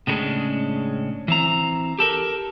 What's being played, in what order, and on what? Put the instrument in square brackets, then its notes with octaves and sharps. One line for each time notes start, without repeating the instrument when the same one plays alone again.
[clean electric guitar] A2 C#3 G3 G#3 C#4 D4
E3 C4 A#5
G4 A4 A#4